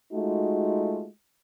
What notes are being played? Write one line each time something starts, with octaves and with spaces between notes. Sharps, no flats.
G#3 A3 D#4 F4 F#4